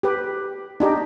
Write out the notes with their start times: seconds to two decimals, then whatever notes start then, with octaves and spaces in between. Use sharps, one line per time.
0.03 G4 B4
0.80 D4 D#4 G4